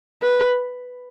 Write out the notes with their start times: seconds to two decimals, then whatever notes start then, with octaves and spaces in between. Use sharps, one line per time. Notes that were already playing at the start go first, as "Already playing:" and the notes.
0.22 B4